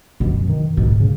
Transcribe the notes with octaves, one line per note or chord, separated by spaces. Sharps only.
F#2 B2
D#3
G#2 B2
C#3